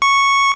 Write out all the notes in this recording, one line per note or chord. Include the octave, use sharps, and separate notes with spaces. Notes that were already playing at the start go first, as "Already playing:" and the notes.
C#6